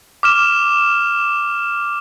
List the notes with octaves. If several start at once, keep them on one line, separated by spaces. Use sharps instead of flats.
D6 F6 E7